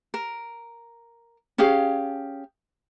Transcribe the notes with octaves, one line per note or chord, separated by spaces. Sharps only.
A#4
C#4 G4 G#4 F5